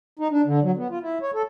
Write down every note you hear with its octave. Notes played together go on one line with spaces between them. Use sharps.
D#4
D4
D3
F#3
B3
F4
E4
C#5
A4